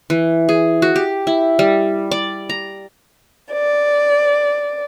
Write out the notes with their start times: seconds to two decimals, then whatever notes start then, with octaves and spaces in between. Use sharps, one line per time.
0.10 E3
0.49 G#4
0.82 F#4
0.96 G4
1.27 E4
1.59 G3
2.11 D5
2.50 A#5
3.53 D5